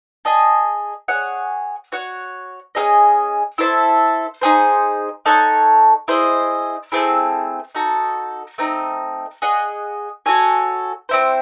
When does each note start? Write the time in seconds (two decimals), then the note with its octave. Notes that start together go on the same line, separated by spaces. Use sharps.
0.25 G#4 D#5 A5
1.08 G#4 C#5 F#5
1.92 F#4 C#5 F#5
2.75 C#4 E4 G#4 D#5
3.58 E4 A4 C5 E5
4.41 D#4 G#4 C5
5.26 D#4 A4 C#5 F#5
6.08 E4 G#4 C5 D#5
6.92 A3 C4 E4 G#4
7.75 D#4 F#4 A4
8.58 A3 C4 D#4
9.42 G#4 D#5 F#5
10.26 F#4 A4 C#5 G#5
11.09 C4 E4 C5